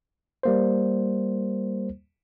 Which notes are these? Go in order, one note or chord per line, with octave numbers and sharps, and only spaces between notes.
G3 A#3 C5